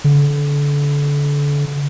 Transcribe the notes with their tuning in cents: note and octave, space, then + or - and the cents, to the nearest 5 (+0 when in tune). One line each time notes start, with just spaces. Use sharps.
D3 -30